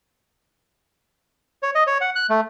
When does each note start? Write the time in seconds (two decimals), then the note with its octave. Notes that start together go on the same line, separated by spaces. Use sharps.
1.63 C#5
1.75 D#5
1.87 C#5
2.01 F#5
2.15 F#6
2.30 A3